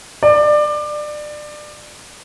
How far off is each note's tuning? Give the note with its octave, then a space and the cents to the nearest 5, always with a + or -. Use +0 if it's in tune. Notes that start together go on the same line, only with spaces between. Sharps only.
D5 +25